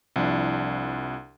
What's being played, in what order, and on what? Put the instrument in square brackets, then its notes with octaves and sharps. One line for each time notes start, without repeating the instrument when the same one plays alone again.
[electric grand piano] C2 F3 D4 E4